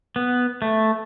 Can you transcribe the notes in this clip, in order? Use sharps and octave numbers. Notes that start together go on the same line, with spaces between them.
B3
A3